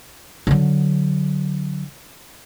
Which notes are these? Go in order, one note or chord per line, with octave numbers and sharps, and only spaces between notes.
D3 F#3